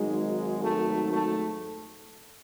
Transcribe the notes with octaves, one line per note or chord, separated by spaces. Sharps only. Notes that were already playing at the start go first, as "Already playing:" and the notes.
Already playing: G#1 G#2 F#3 G#3
A3
A3